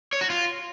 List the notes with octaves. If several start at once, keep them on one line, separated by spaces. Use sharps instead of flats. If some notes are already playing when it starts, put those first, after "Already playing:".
C#5
F#4
F4